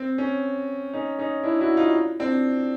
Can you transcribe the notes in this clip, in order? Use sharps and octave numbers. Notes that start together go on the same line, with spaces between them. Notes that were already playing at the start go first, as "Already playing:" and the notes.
Already playing: C4
C#4
C#4 D#4
C#4 D#4
D4 E4
E4 F#4
D#4 F4
C4 D4